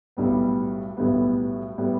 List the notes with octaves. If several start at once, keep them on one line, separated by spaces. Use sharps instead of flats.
B1 A2 G3 B3
B1 A2 G3 B3
A2 G3 B3